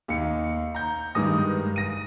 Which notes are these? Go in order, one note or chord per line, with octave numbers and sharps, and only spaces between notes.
D#2 D#4 C#7
A#5 G6
G2 D#3 G#3 B4 D#6 A#6
A#6 D#7